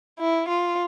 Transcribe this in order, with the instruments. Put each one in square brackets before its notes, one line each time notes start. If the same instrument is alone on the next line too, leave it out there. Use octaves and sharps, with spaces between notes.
[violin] E4
F4